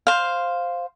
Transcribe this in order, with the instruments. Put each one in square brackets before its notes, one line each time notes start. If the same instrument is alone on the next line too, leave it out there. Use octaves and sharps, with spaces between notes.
[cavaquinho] C5 F5